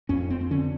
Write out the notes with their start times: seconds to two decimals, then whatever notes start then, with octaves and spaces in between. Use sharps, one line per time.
0.09 F2 C#4
0.30 C4
0.41 C4
0.51 D3 C#4